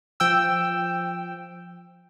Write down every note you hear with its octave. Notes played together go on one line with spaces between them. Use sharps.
F3 G5 E6